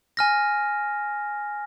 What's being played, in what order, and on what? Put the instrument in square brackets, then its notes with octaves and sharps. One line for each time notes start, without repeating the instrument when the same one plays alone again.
[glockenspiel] G#5 F6 A#6